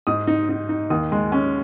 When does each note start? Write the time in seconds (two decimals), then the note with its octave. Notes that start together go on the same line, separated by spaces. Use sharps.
0.07 G#2 D#6
0.27 D#4
0.49 D#4
0.69 D#4
0.90 D#2 D#6
1.12 G#3
1.32 C#4